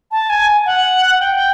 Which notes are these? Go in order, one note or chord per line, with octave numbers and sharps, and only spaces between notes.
A5
G#5
F#5
G5